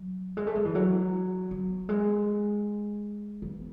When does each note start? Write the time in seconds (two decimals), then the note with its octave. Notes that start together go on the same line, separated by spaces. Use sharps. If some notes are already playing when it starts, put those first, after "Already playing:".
Already playing: F#3
0.37 G#3
0.47 A3
0.55 G#3
0.65 E3
0.75 F#3
1.51 F#3
1.89 G#3
3.42 E3